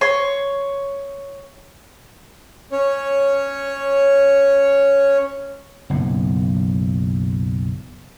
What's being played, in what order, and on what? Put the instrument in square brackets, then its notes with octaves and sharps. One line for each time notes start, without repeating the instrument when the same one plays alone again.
[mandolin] C#5 C6
[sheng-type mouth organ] C#4 C#5
[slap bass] F#1 B1 A2